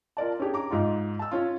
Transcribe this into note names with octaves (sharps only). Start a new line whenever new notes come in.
F4 A#4 D5 A5
C#4 D4 G4 G#4
A#5 D6
G#2 D#4 F4
A5 E6
C#4 F4